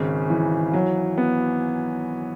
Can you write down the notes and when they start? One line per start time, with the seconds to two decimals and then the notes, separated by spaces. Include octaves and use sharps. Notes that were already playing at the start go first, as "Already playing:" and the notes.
Already playing: G#1 C#3
0.30 E3
0.74 F#3
1.18 B3